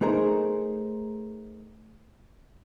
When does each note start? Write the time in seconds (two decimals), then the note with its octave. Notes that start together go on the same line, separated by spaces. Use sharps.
0.01 A3 D#4 G#4 A#4 C5